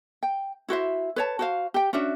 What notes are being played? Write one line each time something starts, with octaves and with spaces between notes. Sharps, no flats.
G5
E4 F#4 C5 E5
B4 C#5 A5
F#4 C5 F5
G4 G5
C#4 D4 F#4 E5